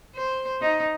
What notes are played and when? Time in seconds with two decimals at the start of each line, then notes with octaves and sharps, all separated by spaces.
0.15 C5
0.61 D#4